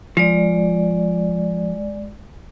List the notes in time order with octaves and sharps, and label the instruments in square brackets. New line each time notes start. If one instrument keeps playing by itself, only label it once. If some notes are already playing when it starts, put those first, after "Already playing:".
[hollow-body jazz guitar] F3 [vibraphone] G#3 D5